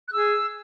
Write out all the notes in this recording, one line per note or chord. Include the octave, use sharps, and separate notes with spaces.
F#6
G#4 E6